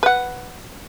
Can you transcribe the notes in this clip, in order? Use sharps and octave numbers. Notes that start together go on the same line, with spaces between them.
B4 F#5